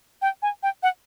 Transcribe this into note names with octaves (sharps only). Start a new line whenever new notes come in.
G5
G#5
G5
F#5